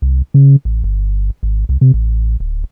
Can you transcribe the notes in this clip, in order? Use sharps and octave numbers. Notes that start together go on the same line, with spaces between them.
C2
C#3
A1
G1
G#1
C2
C3
A1
D1